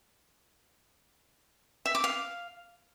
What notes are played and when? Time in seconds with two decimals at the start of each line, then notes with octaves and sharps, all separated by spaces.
1.86 E5
1.95 D6
2.04 F5